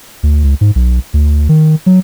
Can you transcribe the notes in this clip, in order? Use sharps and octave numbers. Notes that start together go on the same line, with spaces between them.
D2
C#2
G#2
B1
D2
D#3
F#3